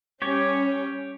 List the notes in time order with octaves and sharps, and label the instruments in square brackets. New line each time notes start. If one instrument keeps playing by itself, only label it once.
[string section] G3 C#4 [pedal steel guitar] G4 C#5